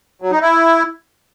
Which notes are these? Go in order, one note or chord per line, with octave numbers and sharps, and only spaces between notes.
F#3
D#4
E4